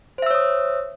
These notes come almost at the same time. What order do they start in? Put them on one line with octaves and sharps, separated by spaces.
C5 E5 E6 C#5 D#6